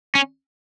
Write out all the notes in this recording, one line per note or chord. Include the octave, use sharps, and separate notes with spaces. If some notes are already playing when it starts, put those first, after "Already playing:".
C#4